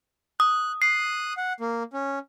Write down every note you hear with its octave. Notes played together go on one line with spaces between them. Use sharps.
D#6 F#6
D#6 F#6 C7
F#5
A#3
C#4